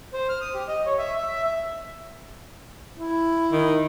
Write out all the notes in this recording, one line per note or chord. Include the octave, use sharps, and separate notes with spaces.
C5
F6
D#6
G4
D#5
C#5
E5
E5
E5
E5
E4
D#3